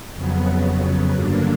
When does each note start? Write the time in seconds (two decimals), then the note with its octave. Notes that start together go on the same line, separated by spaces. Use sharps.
0.13 F2 C#3 F#3 B3
1.12 G2 D3 F#3 A#3 D4